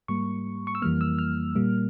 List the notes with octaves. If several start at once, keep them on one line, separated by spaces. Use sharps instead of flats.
G#2 G3 A#3 C#6
C#6
E6
F2 E3 G3 A#3 F6
E6
F6
A#2 G3 A#3